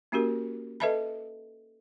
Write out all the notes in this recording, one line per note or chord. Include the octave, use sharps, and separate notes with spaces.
A#3 C#4 F#4 G4 A#4
A4 B4 D#5 E5 A5 B5